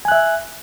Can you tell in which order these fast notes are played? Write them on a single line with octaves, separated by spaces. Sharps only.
G#5 F#6 E5